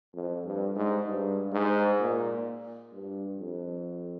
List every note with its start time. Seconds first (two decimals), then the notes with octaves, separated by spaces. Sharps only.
0.14 F2
0.45 G2
0.76 G#2
1.06 G2
1.52 G#2
1.99 A#2
2.92 G2
3.39 F2